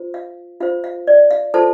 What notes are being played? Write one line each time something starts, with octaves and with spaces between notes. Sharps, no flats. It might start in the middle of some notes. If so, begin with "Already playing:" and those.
Already playing: F4 C5
F5
F4 C5 F5
F5
D5
F5
F4 A4 C5 A5